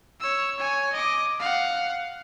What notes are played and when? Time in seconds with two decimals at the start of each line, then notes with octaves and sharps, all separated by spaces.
0.20 C#5 E6
0.59 C#5 G#5
0.93 D#5 D6
1.39 F5 F#5